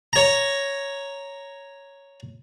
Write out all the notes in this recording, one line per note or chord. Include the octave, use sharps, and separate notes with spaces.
C#5 A#5